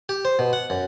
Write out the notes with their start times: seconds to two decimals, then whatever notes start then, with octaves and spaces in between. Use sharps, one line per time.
0.09 G4
0.25 C5
0.39 B2
0.53 F#5
0.70 F#2